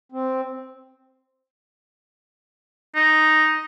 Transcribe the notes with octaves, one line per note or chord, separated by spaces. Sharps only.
C4
D#4